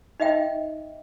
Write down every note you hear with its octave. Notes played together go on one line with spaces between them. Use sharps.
D#4 D#5 E5 G5